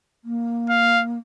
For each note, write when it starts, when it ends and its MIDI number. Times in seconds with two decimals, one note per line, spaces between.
0.24 1.18 58
0.70 1.03 77